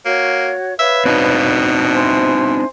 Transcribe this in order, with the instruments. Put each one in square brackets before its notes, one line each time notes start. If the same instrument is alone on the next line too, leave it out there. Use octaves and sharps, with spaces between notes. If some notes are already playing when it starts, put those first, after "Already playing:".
[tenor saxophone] A#3 [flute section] F#4 C#5
[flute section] B4 C#5 F5 [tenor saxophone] E5
[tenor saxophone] B2 [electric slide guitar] C4 D4 D#4
[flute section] E4 C5 G#5